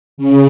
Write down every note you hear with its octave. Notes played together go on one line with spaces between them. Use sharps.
C#3